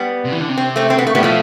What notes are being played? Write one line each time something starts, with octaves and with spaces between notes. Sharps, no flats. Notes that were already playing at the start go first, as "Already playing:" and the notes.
Already playing: G3 B3
C3
E3
D3
C3
C4
A3 C4
C4
B3
A3
A2 G3 B3
B2 F3 A3